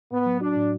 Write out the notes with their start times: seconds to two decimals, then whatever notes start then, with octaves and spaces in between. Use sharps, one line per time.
0.11 A2 B3
0.26 F#3
0.41 D4 F#4
0.56 A2